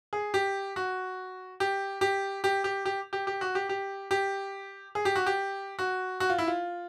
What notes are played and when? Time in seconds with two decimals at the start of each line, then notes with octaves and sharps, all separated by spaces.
0.13 G#4
0.34 G4
0.76 F#4
1.60 G4
2.01 G4
2.44 G4
2.64 G4
2.86 G4
3.13 G4
3.27 G4
3.41 F#4
3.55 G4
3.69 G4
4.11 G4
4.95 G#4
5.05 G4
5.16 F#4
5.26 G4
5.79 F#4
6.20 F#4
6.30 F4
6.38 E4
6.47 F4